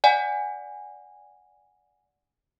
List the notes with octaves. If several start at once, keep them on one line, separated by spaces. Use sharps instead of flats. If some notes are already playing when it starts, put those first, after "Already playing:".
D5 F#5 G#5